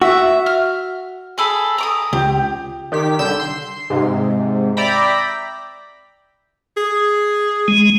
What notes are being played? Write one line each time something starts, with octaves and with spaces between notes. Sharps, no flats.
F#4 E5
F6
G#4 A4 B5
A#5 D6 D#6
C#2 G4
D#3 G4 B6
C2 D3 E6 G6 E7
C6
G#2 C3
D5 E5 G5 A#5 B5
G#4
G#3